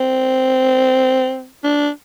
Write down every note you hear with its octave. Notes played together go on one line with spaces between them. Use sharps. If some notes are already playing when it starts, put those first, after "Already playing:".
Already playing: C4
D4